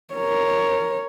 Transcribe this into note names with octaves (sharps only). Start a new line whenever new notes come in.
A#4 C#5